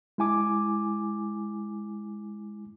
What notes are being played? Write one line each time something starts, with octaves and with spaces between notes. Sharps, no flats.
G#3 E4 G#5 D6